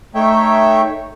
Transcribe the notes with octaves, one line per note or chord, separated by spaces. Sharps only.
A3 D#4 C#5 E5 G5